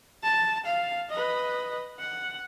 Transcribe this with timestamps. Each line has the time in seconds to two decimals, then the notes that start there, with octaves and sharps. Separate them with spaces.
0.23 A5
0.66 F5
1.10 B4 D#5
2.00 F#5